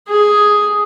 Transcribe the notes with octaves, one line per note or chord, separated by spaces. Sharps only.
G#4